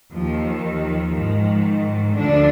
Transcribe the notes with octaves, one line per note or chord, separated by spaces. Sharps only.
D#2 D#3 F3
F3
G#2 D#3
D2 D3 F3 D4